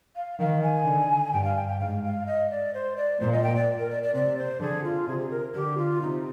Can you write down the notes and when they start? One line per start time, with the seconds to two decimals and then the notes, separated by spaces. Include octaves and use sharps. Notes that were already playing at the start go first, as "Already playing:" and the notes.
0.15 F5
0.39 D#3 F5
0.62 G#5
0.85 D3
1.32 G2 G5
1.43 F5
1.56 G5
1.67 G5
1.79 G#2 F5
2.03 F5
2.26 D#5
2.49 D5
2.73 C5
2.96 D5
3.20 A#2 C5
3.32 D#5
3.43 G5
3.55 D5
3.78 A#4
3.90 D5
4.02 D5
4.13 C3 D5
4.37 C5
4.60 D3 G#4
4.83 F4
5.07 C3 G#4
5.18 G#4
5.30 A#4
5.54 D3 G4
5.77 F4
6.01 C3 D#4